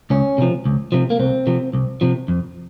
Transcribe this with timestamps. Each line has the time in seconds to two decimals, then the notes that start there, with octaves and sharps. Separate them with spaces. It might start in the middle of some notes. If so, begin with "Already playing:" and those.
0.10 C#2 C#4
0.38 C3 F3
0.65 C#2
0.92 C3 F3
1.10 A#3
1.19 C2 C4
1.47 C3 F3
1.74 C2
2.01 C3 F3
2.28 F2